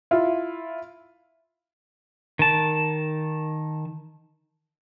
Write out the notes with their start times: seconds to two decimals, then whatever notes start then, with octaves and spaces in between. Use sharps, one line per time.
0.11 E4 F4
2.39 D#3 A5